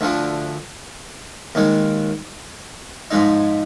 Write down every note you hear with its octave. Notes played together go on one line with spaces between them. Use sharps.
D2 D3 F3
D#2 D#3 G#3
G#2 F3 G#3 D#4